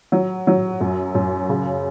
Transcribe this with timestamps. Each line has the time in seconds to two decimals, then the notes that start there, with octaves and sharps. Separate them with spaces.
0.12 F#3
0.47 F#3
0.81 F#2
1.15 F#2
1.49 C#3